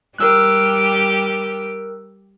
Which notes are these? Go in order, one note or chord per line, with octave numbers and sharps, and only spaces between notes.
G3 G4 A#4 E6 F#6